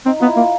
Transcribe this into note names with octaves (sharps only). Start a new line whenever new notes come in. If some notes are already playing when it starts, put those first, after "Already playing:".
C4 D#4
B3 F4
E4
A#3 F4